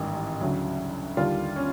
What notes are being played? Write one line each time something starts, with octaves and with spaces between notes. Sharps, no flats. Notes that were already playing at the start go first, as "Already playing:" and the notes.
Already playing: A1 G#2 D#3 G3
D2 C#3 F#3
D#2 D3 G3 F4
C#4